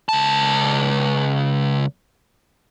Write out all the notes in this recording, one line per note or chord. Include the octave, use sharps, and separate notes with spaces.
C#2 A5